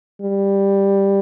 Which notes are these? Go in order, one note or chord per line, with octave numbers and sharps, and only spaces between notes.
G3